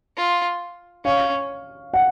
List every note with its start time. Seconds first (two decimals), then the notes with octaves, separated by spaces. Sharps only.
0.17 F4
1.04 C#4 F5
1.94 F#5